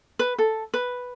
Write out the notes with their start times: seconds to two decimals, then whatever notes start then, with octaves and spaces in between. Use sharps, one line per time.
0.19 B4
0.38 A4
0.74 B4